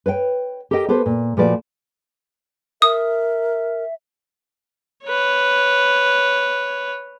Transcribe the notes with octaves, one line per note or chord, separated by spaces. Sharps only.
B4 C#5 F5 G5
G4 A4 A#4 D#5 G5
B3 G4 A4 B4 C5
A#2
A#2 F3 A3 F#4 B4 D5
A#4 E5 D#6
B4 C#5